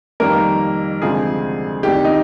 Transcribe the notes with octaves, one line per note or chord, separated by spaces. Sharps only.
F2 D#3 G3 A#3 A#4
D2 C3 F3 G#3 G#4
C2 C3 D#3 G4
D#4